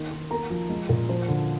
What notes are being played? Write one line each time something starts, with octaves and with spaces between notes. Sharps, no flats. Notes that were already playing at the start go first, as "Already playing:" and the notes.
Already playing: D#3 A#3 C6
D#3
A#3 A#5
F3
G#3
A#2
F3 C5
D3